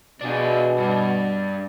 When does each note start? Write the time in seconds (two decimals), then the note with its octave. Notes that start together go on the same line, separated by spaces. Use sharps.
0.21 B2 D4 G#4
0.78 G2 D4